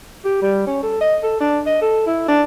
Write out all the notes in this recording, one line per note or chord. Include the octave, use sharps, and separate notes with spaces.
G4
G3
C#4
A4
D#5
A4
D4
D#5
A4
E4
D4